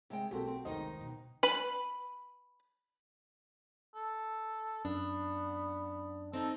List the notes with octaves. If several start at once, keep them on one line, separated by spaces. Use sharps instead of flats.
C3 G#3 G5
B1 A#3 C4 F#4 G4 A4
C4
F1 C#2 D#3 D#4 C5 D#5
B2
B4 B5
A4
F#2 B3 D4
C4 D#4 A4